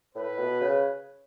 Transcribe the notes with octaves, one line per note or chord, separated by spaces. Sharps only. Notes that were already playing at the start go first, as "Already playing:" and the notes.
A2 B4
B2
C#3